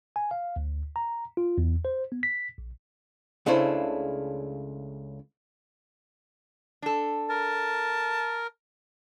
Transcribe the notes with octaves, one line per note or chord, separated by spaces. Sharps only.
G#5
F5
D2
A#5
F4
E2
C5
B3
B6
A#1
C#2 C#3 A3 D4 E4 C5
D4 A4
A#4 A5